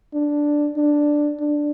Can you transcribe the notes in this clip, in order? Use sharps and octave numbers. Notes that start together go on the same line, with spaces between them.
D4
D4
D4